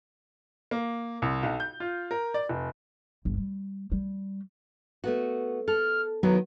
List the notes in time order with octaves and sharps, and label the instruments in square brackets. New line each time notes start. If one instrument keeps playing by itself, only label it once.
[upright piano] A#3
C2
B1
G6
F4
A#4
D5
F1
[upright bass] G1
G3
G3
[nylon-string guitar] A3 B3 F#4
[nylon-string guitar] A4 [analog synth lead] F6
[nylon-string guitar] D#3 B3 E4 [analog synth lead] F#3